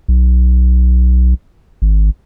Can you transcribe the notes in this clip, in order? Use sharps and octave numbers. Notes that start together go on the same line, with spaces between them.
B1
G#1